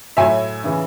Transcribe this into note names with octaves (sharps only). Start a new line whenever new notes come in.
A2 F#3 E5 G#5
C#3 E3